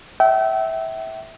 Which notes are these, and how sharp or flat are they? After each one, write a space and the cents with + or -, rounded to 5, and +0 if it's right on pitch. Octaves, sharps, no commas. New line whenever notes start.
E5 -15 G5 -40